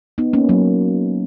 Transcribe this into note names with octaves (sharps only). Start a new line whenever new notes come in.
B3 D#4
A#3 C#4
F#3 A#3